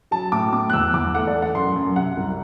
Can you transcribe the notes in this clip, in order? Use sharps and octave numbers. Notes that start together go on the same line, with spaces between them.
F#3 A5
A2 D6
B3 D6
F#6
E2 E6
E2 D6
A3 F#5
D5
A3
F#5
F#2 C6
F#2
C3 F#5
C2